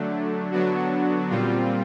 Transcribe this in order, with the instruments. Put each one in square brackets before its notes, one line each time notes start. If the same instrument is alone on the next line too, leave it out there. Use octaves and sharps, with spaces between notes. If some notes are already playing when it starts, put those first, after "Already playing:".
Already playing: [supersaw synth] D3 F#3 A3 D4
D3 F#3 B3 D4 F#4
A#2 G3 C4 F4